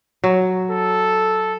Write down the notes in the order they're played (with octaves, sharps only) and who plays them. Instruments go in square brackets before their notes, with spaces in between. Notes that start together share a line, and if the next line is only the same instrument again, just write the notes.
[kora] F#3
[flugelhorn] A4